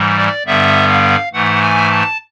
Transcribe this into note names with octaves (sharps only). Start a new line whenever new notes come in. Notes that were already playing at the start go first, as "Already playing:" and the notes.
Already playing: G#2 E3 G3
D5
G2 D3 G3 B3 E5
F5
G#2 E3 A3 F#5
G#5
A5